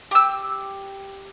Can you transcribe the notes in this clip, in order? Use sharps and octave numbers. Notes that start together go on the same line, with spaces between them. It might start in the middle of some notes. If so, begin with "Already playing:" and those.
G4 E6